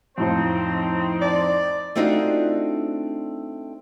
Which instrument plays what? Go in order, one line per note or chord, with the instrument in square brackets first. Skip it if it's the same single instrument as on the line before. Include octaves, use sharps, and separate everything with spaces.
[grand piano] F2 A2 F3 [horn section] C4 D#4 C5
[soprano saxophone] D5
[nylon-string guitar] A3 C4 D4 D#4 F4 F#4